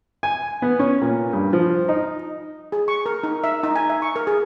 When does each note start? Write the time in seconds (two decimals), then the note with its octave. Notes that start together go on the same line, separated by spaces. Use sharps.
0.23 G#5
0.62 B3
0.80 C#4
1.02 A#2
1.33 G2
1.53 F3
1.89 D#4
2.72 G#4
2.88 C#6
3.06 A#4
3.23 D#4
3.44 E5
3.63 D#4
3.76 G#5
3.90 E5
4.02 C#6
4.16 A#4
4.27 G#4